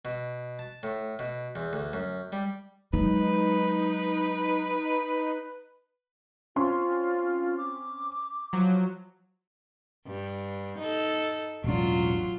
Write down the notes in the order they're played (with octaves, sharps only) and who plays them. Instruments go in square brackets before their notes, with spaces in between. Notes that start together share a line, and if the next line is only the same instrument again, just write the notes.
[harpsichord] B2
A5
A2
B2
E2
D2
F#2
G3
[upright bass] F#3 G#3 [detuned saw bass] D#4 [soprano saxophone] B4
[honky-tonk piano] C4 C#4 C6 [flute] F4
[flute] D6
[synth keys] F3 F#3
[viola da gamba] G2
D#4 A4
[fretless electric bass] E1 A1 D4 [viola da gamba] F#3 F4